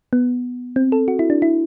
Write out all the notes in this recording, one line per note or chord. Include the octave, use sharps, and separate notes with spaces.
B3
C4
A4
F#4
E4
D4
E4